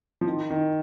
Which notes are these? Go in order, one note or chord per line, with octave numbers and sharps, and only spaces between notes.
F3
D#3
D#3